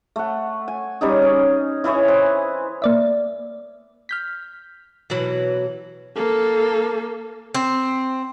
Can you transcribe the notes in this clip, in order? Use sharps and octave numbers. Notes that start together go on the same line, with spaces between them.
A3 F#5
G#5
G3 C#4 D#4 G#4
C#4
E3 E4 G#4 C#5
B4 C5 G#5
A#3 D5 E5
F6 G6 B6
B2 E3 F#3
A#3 A4
C4